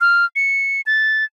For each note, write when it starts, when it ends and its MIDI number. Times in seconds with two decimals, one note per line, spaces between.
0.01 0.25 89
0.36 0.81 97
0.86 1.24 93